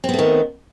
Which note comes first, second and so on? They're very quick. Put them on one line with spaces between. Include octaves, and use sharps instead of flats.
C4 B3 A3 D#3